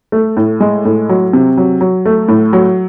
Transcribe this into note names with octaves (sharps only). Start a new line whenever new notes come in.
A3
A2
G#3
A2
F#3
C3
F#3
F#3
A3
A2
F#3